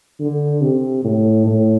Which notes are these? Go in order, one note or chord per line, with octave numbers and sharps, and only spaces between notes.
D3
C3
A2
A2